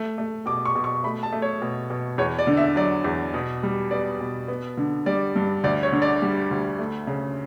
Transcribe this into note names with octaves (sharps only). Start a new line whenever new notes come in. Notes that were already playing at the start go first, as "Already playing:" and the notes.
Already playing: A3
A3
B2 D6
C#6
B2
C#6
A3 B5
A5
A3
C#5
B2
B2
E2 C#5
D5
D3
E5
F#3 D5
E2
B2
G3
B3 D5
B2
B3
D3
G3 D5
G2
D2 D5
C#5
D3
D5
G3
D2
A3
C#3